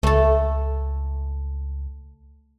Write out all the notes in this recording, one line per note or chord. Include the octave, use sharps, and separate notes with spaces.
C#2 A3 A4